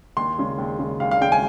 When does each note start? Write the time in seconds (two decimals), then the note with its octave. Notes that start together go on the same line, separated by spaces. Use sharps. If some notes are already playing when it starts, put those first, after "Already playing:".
0.17 D#2 C6
0.38 C#3 G#3
0.58 D#2
0.79 C#3 G#3
1.00 D#2 F5
1.11 F5
1.21 C#3 G#3 G5
1.32 G#5